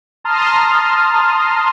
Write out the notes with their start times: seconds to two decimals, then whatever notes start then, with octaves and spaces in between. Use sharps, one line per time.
0.24 A5 A#5 C6 D#6 F6